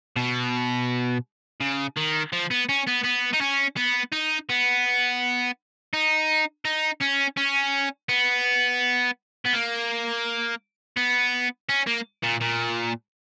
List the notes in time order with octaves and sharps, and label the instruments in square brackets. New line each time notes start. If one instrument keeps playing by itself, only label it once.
[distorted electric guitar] B2
C#3
D#3
F3
B3
C#4
B3
B3
D#4
C#4
B3
D#4
B3
D#4
D#4
C#4
C#4
B3
B3
A#3
B3
C#4
A#3
A#2
A#2